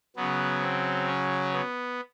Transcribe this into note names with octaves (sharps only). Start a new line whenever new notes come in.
C#3 F#3 B3
C4
C#4
B3